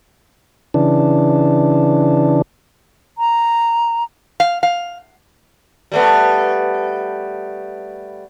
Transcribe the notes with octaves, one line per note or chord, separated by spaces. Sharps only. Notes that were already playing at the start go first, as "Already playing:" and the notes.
C#3 E3 D4
A#5
F5
F5
G3 A3 B3